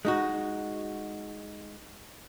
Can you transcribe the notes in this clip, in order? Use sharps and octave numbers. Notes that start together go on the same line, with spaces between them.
G#3 D#4 F#4